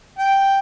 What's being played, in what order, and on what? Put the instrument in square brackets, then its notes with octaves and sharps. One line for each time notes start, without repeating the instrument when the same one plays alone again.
[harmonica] G5